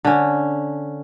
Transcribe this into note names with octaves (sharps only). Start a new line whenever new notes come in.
D3 C#4